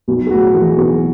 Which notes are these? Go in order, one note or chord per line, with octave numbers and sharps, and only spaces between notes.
B1
G#4
A2 F#4
E3 G#4
B1 G#4